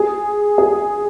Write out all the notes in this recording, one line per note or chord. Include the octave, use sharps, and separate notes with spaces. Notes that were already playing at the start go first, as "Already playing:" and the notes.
Already playing: G#4
G#4